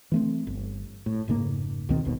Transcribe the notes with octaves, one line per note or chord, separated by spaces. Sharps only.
E3 A3 C4
G1
A2
F1 G#2 C#3 A#3
C#2 B2 D#3 C4
G1 D#2 B2